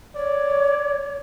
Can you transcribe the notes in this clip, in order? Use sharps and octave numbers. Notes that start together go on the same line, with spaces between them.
C#5 D5